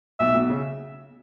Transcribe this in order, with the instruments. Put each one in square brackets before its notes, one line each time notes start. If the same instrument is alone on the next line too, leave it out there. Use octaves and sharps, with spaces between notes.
[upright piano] B1 B2 [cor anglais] E5
[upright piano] B1 B2
C#3